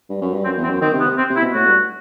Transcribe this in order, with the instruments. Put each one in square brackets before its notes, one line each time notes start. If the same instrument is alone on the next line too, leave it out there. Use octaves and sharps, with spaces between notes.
[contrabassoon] G2
F#2
G2
[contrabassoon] F#2 [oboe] C4
[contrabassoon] E2
[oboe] C4
[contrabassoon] F#2
[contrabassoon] D#3 [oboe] C4
[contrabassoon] C3
[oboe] B3
[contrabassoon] C3
[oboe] C4
[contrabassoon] C3
[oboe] E4
[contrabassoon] B2
[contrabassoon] A2 [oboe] F#4
[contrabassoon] G2